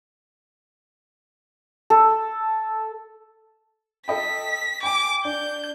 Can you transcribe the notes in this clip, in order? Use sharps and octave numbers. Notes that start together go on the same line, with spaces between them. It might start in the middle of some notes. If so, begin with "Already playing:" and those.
A4
A4 D#5 G5 B6
G5 G#5 D6
D4 G6